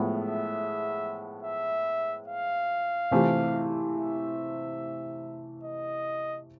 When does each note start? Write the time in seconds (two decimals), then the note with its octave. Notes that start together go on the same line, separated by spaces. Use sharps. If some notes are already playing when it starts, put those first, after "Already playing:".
Already playing: A2 F3 G#3 B3
0.18 E5
1.43 E5
2.28 F5
3.11 C3 E3 A3 C4 F4
3.96 E5
5.64 D#5